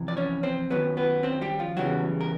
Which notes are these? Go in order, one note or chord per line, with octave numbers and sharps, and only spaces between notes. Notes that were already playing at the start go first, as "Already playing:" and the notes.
Already playing: F2 C3 E3
D5
C#4 C#5
C4 C5
F#2 D#3 F#3 B3 B4
B3 B4
C4 C5
G3 G4
F3 F4
E2 C#3 E3 F#3 G3 F#4
A#4